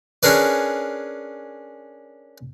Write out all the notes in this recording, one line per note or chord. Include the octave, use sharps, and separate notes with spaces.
C#4 D4 G#4 A#4 B4 D5